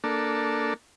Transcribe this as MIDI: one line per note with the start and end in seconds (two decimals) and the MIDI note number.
0.04 0.74 58
0.04 0.74 62
0.04 0.74 69